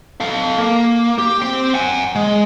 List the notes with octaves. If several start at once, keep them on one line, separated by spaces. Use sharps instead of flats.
A4 F5
A#3
G4
C4 G5
F#5 G#5
G#3